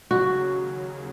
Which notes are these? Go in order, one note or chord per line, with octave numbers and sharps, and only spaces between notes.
D#2 C#3 F#3 F#4